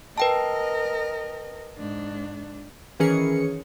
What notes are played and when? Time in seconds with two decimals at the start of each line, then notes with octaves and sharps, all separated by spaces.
0.18 A#4 B4 D#5 G5 A5
1.78 G#2 D4
3.00 D#3 E3 C#4 G#4 A#4 C#7